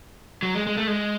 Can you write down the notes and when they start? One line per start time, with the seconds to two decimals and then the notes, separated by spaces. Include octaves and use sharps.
0.43 F#3
0.54 G#3
0.67 G#3
0.77 A3
0.87 G#3